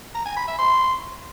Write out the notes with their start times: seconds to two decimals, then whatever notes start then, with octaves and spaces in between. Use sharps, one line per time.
0.14 A#5
0.25 G#5
0.36 B5
0.47 E5
0.59 C6